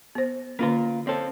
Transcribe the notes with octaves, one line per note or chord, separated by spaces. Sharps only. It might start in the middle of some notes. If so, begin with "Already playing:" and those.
B3 C5
D3 A#3 C#4 F4 A#4
C4 A4 C#5